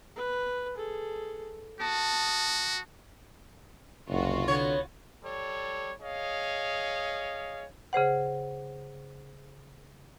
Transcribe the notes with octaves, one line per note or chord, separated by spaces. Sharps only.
B4
G#4 A4
F#4 A5 D#6
F#1 C2 F4 F#4
D3 B3 C#5
G3 A4 C#5
G#4 C#5 D#5 F5
C#3 G#4 C5 F#5